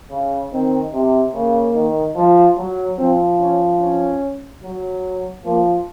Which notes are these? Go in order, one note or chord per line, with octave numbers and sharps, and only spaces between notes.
C#3
D#3 C4
C3
C#3 A#3
D#3
F3
F#3
F3 C4
C#4
C#4
F#3
F3 A#3